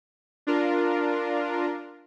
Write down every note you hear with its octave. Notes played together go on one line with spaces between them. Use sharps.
D4 F4 A#4